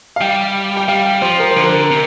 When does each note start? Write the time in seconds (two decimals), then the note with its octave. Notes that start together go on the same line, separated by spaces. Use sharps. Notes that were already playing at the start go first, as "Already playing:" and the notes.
0.16 F5
0.21 G3 G5
0.77 G5
0.88 G3 F5
1.06 G5
1.22 F3 C5
1.40 A#4
1.51 C5
1.56 D3
1.64 A#4
1.90 C3